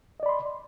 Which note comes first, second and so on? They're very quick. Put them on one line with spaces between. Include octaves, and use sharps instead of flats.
D#5 D5 B5 C6